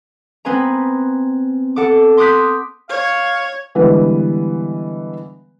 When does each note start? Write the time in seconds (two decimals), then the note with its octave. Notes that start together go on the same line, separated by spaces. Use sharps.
0.45 B3 C4 B4 G#5 A#5
1.76 A4 F#5 D6
2.17 C6 D6 D#6 F#6 G6 B6
2.89 C#5 F5
3.75 D3 E3 G3 G#3 B3 B4